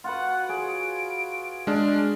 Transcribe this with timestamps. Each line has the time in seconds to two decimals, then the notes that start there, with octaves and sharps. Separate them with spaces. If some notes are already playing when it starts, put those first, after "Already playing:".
0.04 F4 F#4 B4 F#5
0.49 G#4 C#5 D7
1.67 G#3 D4 F6